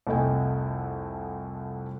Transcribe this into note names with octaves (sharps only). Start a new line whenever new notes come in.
C2 F2 A3 D#5 G5 G#5